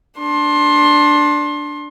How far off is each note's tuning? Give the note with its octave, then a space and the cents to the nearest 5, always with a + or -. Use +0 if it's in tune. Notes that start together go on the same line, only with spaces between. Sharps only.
D4 +0 C6 +25